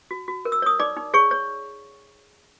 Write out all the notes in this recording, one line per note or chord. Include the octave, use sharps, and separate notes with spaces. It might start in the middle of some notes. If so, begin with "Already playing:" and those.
F#4
F#4
A#4
E6
C#5 D#6
D#4 D5 D6
D#4
G#4 C#5 C#6
C#5